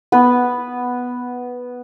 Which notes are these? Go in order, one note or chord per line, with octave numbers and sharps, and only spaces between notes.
B3 B4